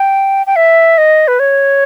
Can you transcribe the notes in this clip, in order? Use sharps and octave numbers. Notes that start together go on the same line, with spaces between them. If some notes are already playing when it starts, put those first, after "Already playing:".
Already playing: G5
G5
E5
D#5
B4
C#5